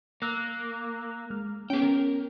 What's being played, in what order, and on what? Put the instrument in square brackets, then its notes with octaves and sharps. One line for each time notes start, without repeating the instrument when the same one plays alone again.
[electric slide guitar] A#3 [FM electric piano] E6 F#6 A#6
[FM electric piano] G#3 F6
[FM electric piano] B3 C#4 [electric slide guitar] G#4 G5
[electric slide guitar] A#4